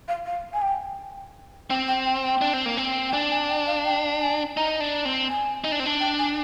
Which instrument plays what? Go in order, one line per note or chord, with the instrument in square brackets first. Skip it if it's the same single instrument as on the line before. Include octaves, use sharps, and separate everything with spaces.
[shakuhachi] F5
F5
G#5
G5
[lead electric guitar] C4 [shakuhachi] G5
[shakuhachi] G5
G5
G5
[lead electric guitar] D4
C4
A#3
C4
[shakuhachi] G5
[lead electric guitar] D4 [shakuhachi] G#5
[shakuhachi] G#5
G5
F5
G5
G#5
[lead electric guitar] D#4 [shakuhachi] A#5
[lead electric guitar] D4
C4
[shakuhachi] G#5
[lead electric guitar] D#4
D4
C4
D4
[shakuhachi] G5
G#5